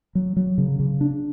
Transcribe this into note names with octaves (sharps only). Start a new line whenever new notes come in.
F#3
F#3
C#3
C#3
D4